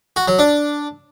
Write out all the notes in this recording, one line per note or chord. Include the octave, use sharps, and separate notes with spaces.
F#4
F#3
D4